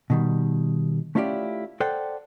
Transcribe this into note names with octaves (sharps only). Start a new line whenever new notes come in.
B2 D#3 G3
A3 C#4 E4 F4 G4 D5
A4 C5 D5 F#5 G5